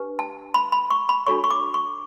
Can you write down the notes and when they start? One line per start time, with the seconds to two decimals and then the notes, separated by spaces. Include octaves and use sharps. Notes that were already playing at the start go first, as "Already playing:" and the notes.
Already playing: D4 G4 B4
0.19 A5
0.54 B5
0.72 B5
0.90 C#6
1.09 B5
1.27 D4 F#4 A4 C#5 C#6
1.44 C#6
1.50 D6
1.74 C#6